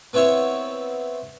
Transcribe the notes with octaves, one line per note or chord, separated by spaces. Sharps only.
B3 C4 E4 C#5 E5